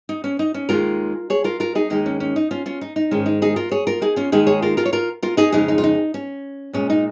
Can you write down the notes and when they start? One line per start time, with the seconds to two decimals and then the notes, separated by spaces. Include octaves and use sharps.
0.09 D#4
0.24 C#4
0.39 D#4
0.54 C#4
0.69 D#2 D#3 G#3 F4 A#4
1.30 G#4 C#5
1.44 F4 A#4
1.60 F4 A#4
1.75 D#4 G#4
1.90 D#2 D#3 G#3 D#4
2.06 C#4
2.20 C#4
2.36 D#4
2.51 C#4 F4
2.66 C#4 F4
2.81 D#4
2.96 D#4
3.11 G#2 D#3 G#3 C#4
3.26 D#4
3.42 D#4 G#4
3.56 F4 A#4
3.71 G#4 C#5
3.87 F4 A#4
4.01 D#4 G#4
4.16 C#4 F4
4.32 D#2 D#3 G#3 D#4 G#4
4.47 G#4 C#5
4.62 F4 A#4
4.77 F4 A#4
4.85 C#5
4.93 F4 A#4
5.23 F4 A#4
5.37 D#4 G#4
5.52 F2 C#3 G#3 D#4 G#4
5.68 D#4
5.78 F4
5.84 D#4
6.14 C#4
6.73 A#2 G#3 C#4
6.90 D#4